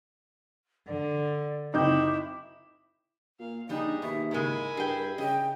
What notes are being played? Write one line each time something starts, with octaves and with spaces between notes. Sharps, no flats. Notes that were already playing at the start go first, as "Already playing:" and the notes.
D3 D5
F#1 C4 D#4 E4 D6 G6
A#2 F5
A#1 G3 D4 D#4 G#4
D#2 B2 E5
G#2 C#3 G#3 E4 A#4 G#5
G2 G#4 G5
C#3 D#5 G5